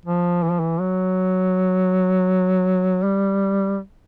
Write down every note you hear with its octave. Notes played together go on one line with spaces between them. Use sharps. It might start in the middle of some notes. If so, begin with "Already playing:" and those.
F3
E3
F3
E3
F#3
G3